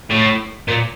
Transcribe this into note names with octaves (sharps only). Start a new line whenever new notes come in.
A2
A#2